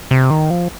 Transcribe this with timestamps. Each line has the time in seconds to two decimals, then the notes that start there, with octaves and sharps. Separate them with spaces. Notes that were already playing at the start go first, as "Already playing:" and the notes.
0.11 C3
0.31 D#3
0.50 F3